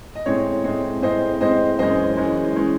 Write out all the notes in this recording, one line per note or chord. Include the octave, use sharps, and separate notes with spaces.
D#5
A2 G#3 C4 C#5
A2 G#3 C4
A2 G#3 C4 C5 D#5
A2 G#3 C4 C5 D#5
F#2 E3 G#3 C#4 C5 D#5
F#2 E3 G#3 C#4
E3 G#3 C#4